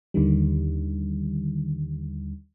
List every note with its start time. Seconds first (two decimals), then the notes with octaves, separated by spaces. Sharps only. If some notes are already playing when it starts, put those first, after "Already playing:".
0.14 D#2 D3 D#3 G3